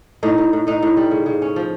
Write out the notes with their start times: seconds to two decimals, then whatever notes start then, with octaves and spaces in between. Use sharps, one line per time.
0.23 A2 D#4
0.38 A2
0.53 A2
0.67 A2 D#4
0.82 A2
0.97 G3
1.11 C#3
1.26 C#3
1.42 C#4
1.56 F3